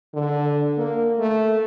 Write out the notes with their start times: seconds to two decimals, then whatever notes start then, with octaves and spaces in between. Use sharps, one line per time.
0.14 D3
0.78 A#3
1.19 A3